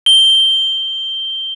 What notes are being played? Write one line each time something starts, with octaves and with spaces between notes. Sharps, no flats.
G7